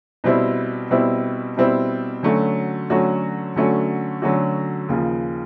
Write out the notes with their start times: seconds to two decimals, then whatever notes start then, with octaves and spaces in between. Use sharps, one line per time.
0.24 B2 G3 C4 E4
0.90 B2 G3 C4 E4
1.57 B2 G3 C4 E4
2.23 D3 F#3 A3 C#4 F#4
2.90 D3 F#3 A3 C#4 F#4
3.56 D3 F#3 A3 C#4 F#4
4.22 D3 F#3 A3 C#4 F#4
4.89 D#2 C#3 F3